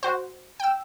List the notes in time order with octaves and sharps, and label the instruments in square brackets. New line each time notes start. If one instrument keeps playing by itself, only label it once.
[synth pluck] F#4 C5
G5 E6